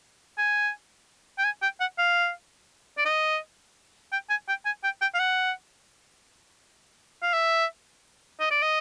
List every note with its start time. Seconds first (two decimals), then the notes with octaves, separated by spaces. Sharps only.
0.38 G#5
1.38 G5
1.44 G#5
1.62 G5
1.80 F#5
1.98 F5
2.98 D5
3.05 D#5
4.12 G5
4.30 G#5
4.48 G5
4.65 G#5
4.84 G5
5.01 G5
5.14 F5
5.19 F#5
7.22 F5
7.33 E5
8.40 D#5
8.51 D5
8.62 D#5